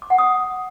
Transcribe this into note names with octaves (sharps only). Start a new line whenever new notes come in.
D6
F#5
D#6